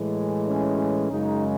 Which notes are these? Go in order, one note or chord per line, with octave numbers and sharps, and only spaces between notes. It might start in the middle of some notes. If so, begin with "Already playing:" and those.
Already playing: A2 E3 G#3
C#4
F#2 C#3 G#3 D#4